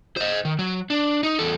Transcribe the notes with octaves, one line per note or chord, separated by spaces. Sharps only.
C5 D#5
D#3
F#3
D4
D#4
E2 A4